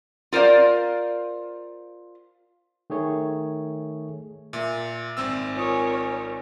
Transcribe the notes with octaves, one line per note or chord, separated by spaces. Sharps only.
F4 A#4 C5 D5 F5
D#3 A3 G#4 C#5
A#2 E5
G#1 C4 E6
F4 A#4 C#5 G#5 D#6